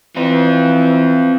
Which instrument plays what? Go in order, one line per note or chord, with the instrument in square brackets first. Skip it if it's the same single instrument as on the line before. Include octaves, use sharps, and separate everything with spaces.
[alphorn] E3 [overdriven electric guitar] C4 F4